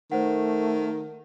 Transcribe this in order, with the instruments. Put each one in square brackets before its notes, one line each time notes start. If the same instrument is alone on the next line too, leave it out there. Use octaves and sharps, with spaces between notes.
[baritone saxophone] D#3 [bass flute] A3 [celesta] C5 F#5